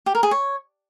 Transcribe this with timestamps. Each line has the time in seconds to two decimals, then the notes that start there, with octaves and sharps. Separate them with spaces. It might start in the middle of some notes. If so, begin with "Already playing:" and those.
0.06 G4
0.15 A#4
0.23 G#4
0.31 C#5